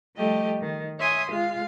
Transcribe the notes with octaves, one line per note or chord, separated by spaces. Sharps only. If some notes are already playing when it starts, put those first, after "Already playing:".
F3 G3 A3 G4 D#5
D#3
C#5 E5 G#5 C6 D#6
G#3 F4 F5